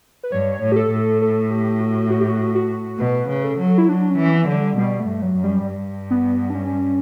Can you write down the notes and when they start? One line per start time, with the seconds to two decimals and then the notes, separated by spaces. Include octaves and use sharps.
0.23 B4
0.32 G2 C#5
0.62 A2
0.72 G4
0.76 A4
0.91 A2
1.22 A4
1.50 G4
1.80 F#4
2.10 F#4
2.20 G4
2.29 F#4
2.55 F#4
2.99 B2 B4
3.29 C#3
3.44 A4
3.59 F#3
3.78 E4
3.88 F#3 D4
4.10 C#4
4.18 E3
4.33 B3
4.46 D3 F#3
4.55 G3
4.77 B2 G3
5.00 A3
5.07 G2
5.22 F#3
5.37 F#2
5.44 G3
5.66 G2
6.11 B3
6.50 D4
6.55 C#4